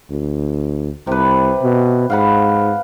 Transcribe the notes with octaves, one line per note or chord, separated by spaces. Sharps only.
D2
C2 C3 B4
B2
G#2 F5 F#5 B5